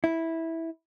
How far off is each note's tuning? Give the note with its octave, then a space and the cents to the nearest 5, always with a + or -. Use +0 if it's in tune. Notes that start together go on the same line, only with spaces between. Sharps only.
E4 -10